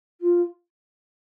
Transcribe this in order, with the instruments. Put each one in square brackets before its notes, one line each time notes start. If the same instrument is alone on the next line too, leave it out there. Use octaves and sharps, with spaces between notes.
[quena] F4